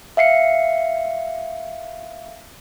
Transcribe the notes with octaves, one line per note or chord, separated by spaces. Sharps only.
E5 F5 C7 C#7